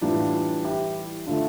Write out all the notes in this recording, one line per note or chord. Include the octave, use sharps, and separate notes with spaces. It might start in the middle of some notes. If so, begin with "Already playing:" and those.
A2 E3 G3 D4 F4
E4 G4
D3 A3 D4 F4